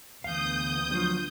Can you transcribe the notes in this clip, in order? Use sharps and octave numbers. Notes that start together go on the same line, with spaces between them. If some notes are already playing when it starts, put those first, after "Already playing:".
D2 E3 B3 F5 D#6 G6
F3 F#3 D4 F4